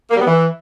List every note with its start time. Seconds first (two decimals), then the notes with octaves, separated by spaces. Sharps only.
0.11 A#3
0.16 G3
0.21 B3
0.26 E3